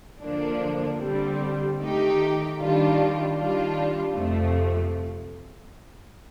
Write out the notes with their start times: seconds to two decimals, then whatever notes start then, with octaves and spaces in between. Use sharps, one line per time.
0.21 D3 F3 A#3 D4
1.00 D3 G3 C4
1.78 D#3 A3 D#4 G4
2.58 D#3 G3 D4 F4
3.36 D#3 G3 D4 F4
4.15 F2 C3 F3 A3